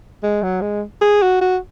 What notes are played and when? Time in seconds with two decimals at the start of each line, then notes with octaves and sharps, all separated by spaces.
0.23 G#3
0.43 F#3
0.62 G#3
1.02 G#4
1.22 F#4
1.41 F#4